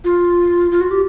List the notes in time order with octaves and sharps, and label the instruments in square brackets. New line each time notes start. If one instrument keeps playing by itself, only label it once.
[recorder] F4
F4
F#4
G4